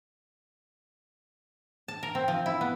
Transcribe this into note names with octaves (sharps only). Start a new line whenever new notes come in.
A5
A#4
C4
F3
E4
B3